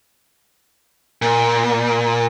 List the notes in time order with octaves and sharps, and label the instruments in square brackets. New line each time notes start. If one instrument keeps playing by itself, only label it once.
[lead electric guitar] A#2